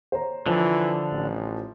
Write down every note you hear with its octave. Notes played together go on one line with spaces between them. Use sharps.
C5 C#5 A#5
D3 E3 F3
A1